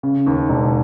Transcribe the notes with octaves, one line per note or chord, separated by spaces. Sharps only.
C#3
D#2
E1